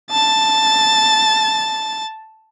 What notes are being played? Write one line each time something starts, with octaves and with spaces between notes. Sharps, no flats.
A5 A6